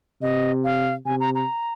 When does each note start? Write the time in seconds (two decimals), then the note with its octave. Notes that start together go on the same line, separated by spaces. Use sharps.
0.22 C3 D#5
0.64 F5
1.06 C3 G#5
1.20 A#5
1.35 A#5